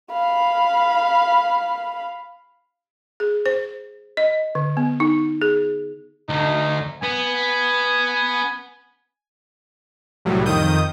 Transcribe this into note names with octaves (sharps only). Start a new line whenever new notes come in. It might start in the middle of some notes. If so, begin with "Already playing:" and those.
F5 B5
G#4
C5
D#5
D3
B3
D#4
G#4
D2 D#4
B3 G#5
C2 A2 F#3 G3
F2 D#3 D#6 G6